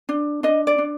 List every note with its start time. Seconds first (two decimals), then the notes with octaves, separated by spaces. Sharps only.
0.09 D4
0.43 D4 D#5
0.67 D5
0.78 D4